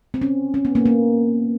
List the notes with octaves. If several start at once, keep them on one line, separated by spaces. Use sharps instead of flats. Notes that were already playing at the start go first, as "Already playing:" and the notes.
C4
C#4
C#4
B3
A#3
A#3